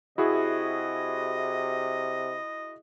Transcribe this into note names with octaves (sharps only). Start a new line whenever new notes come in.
C3 E4 F#4 G#4 D#5